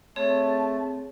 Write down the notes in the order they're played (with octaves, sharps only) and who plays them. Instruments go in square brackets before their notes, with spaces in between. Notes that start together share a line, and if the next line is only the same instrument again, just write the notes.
[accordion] A3 [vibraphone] C4 G#4 [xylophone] C#5 [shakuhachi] A5